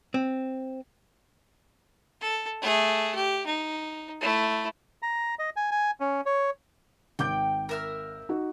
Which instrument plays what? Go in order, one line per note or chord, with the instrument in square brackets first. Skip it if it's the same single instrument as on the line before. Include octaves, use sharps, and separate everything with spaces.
[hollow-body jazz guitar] C4
[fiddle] A4
A3 G#4
G4
D#4
A3 E4
[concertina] A#5
D#5
G#5
G#5
C#4
C#5
[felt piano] G#1 D6 G6 [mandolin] G5
[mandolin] A#4 E5 F6
[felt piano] D#4 F#4